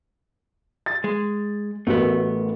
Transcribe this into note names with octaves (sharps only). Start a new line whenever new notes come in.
A6
G#3
A1 A3 B3 F#4 A#4